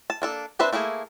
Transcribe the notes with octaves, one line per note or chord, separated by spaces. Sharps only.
A5
A#3 D4 A4
C4 D4 B4 C5 E5
A3 A#3 E4 G#4